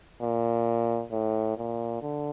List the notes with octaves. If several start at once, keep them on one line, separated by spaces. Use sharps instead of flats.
A#2
A2
A#2
D3